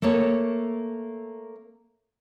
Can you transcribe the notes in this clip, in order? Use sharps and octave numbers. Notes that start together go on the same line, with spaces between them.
A3 A#3 A4 C#5